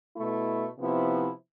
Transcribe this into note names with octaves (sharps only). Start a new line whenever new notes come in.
B2 A3 E4
C3 F3 B3 E4